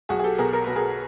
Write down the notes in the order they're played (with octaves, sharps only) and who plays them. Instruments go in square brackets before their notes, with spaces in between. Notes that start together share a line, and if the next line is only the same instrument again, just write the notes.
[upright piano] B1 F#4 G#4
G#4
G4 A4
B2 G#4 A#4
A#4
B2 B4
G#4 A#4